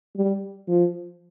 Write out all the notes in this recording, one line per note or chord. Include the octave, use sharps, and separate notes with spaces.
G3
F3